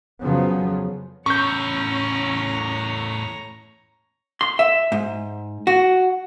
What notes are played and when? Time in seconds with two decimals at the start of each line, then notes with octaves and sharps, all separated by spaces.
0.20 F2 C#3 F3 F#3 B3
1.26 E2 A2 C#4 C#5 A#5 C#6 G6
4.41 C6
4.59 E5
4.92 G#2
5.67 F#4